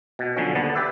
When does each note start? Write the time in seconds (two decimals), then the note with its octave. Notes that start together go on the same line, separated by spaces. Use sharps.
0.19 B2
0.36 B1 D3 F3 C#4
0.55 D#2 D3 B3 A5
0.75 G4 B4 D5 E5